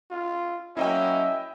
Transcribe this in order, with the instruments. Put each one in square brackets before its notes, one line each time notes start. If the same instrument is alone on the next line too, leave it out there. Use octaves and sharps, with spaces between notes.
[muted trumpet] F4
[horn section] F#3 A#3 C#4 [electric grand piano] E4 D#5 G5 [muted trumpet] E5